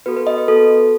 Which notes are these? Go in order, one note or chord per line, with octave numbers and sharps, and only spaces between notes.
B3 F#4 A4 B4
B4
D#5
B4
B3 F#4 A4